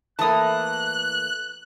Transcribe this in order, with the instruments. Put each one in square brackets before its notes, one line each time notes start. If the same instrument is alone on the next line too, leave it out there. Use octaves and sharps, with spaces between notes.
[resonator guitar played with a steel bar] E3 A3 A#3 [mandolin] A5 D#6 [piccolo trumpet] F#6